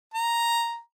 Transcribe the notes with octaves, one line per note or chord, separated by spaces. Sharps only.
A#5